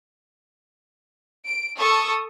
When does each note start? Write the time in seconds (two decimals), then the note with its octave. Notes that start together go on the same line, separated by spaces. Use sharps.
1.44 D7
1.78 A4 C#6 D#6